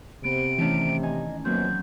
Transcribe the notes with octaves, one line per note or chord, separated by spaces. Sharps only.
C3 B3 D7
D#3 E3 A3 C#4 D4
D#4 D#5 G#5
F#2 B2 F3 F#3 A#3 C4 G6